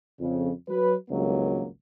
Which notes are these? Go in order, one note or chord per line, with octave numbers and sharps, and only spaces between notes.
F2 C#3
F#3 B4
G#1 C#2 G2 F#3 A#3